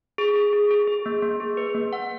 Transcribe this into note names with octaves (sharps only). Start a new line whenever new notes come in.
G#4
G#4
G#4
G#4
G#4
A#3
A#3
G#4
B4
A#3
F#5